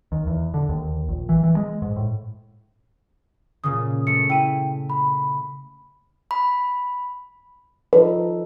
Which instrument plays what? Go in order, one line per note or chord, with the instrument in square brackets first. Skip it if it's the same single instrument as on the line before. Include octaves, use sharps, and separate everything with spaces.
[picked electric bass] D#2
E2
D3
D#2
A#1
E3
E3
G#3
G#2
A2
[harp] A#2 C#3 [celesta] D#6
[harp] A3 [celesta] C#7
[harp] E4 D#7 [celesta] G5
[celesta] B5
[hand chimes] B5
[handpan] F3 D#4 A4 [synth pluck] B4